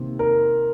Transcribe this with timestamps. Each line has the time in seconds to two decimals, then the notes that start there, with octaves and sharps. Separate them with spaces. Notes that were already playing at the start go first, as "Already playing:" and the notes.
Already playing: C3 D#3 A#3
0.19 A#4